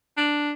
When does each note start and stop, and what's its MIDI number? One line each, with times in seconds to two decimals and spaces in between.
0.17 0.52 62